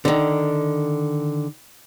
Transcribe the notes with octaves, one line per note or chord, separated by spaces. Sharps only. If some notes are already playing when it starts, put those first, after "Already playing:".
D3 D#3